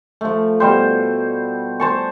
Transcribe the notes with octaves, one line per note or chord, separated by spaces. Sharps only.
F3 A3
B2 G3 C5
C5 A5 C#6